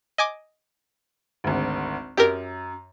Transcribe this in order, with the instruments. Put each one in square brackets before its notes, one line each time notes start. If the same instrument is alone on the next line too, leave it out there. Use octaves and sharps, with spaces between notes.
[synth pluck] D#5 G#5 D6
[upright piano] G#1 D2
[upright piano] F#2 [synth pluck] G4 A#4